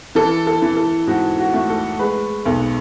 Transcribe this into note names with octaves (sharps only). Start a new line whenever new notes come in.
E3 A4
A4
E3
A4
G#2 F#4
F#4
A3
A4
G#3 B4
B1 A4